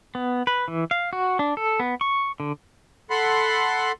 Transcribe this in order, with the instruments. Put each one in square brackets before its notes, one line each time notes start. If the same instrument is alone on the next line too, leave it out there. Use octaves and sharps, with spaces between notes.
[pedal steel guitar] B3
B4
E3
F5
F#4
D4
A4
B3
C#6
D3
[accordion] A4 F#5 B5 C6